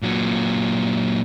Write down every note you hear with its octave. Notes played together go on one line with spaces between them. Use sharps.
A#2 F#3